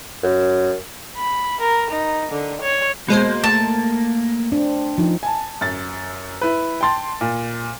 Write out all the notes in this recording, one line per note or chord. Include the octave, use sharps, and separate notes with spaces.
F#2
B5
A#4
D#4
D3
C#5
B2 G#3 A#3 C5
A3 A5
C4 D4
F3 D#4
G#5 A5
F#2 A6
E4 B4
G5 A5 C6 A6
A#2